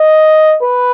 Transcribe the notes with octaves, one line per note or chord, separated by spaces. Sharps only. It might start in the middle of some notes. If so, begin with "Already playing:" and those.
Already playing: D#5
B4